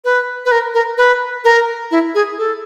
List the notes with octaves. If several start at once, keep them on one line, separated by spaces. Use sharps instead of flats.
B4
B4
A#4
A#4
B4
A#4
E4
G#4
A4